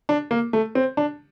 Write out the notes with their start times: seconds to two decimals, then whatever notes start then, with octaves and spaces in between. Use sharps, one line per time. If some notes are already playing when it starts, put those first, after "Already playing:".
0.09 D4
0.31 A#3
0.53 A3
0.75 C4
0.97 D4